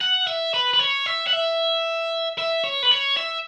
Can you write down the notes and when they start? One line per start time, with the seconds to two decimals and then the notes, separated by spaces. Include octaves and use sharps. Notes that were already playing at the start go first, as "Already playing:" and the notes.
0.01 F#5
0.27 E5
0.54 B4
0.74 B4
0.79 C#5
1.06 E5
1.27 F#5
1.33 E5
2.39 E5
2.64 C#5
2.83 B4
2.91 C#5
3.17 E5